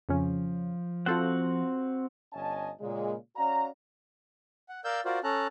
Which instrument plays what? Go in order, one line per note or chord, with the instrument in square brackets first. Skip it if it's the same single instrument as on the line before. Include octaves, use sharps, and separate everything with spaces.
[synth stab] F2 C#3 C#4 [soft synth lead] F3
[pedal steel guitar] C4 F#4 F#5 [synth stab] F4 A4 C5
[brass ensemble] G1 C#4 D#5 G#5 A5
A#2 C#3 G#3
C#4 F#4 D5 F5 A#5
[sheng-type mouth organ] F#5
A#4 D5 F5 E6 G6
F4 F#4 A#4 C5 D5
C#4 A4 A5 A#5 F#6